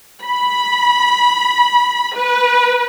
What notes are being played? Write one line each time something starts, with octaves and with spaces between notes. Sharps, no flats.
B5
B4